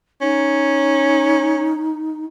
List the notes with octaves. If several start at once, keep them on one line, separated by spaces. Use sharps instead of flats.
C#4 D#4